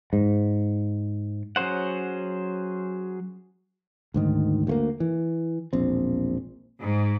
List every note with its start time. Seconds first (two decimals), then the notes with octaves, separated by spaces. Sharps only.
0.13 G#2
1.56 F#3 C#4 G#4 C5 F#5
4.14 D2 G#2 D#3
4.67 D2 A3 A#3
5.00 E3
5.73 E1 A#1 C4
6.81 G#2